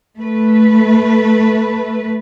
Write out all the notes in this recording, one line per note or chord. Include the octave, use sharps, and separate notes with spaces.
A3 B4